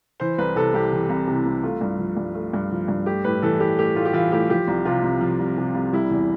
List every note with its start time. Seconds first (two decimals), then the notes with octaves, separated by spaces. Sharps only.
0.20 E3 C5
0.38 C2 B4
0.56 C3 A4
0.73 C2 G4
0.92 E3
1.09 C2
1.27 C3
1.46 C2
1.63 A3 F4
1.81 G2
1.99 F3
2.17 G2
2.34 A3
2.53 G2
2.71 F3
2.88 G2
3.06 A3 G4
3.24 A2 B4
3.42 E3 A4
3.60 A2 G4
3.79 A3 G4
3.95 A2 F4
4.05 G4
4.13 E3 F4
4.32 A2 G4
4.50 F3 G4
4.68 C2
4.85 C3 F4
5.03 C2
5.21 F3
5.39 C2
5.58 C3
5.75 C2
5.92 G3 E4
6.10 E2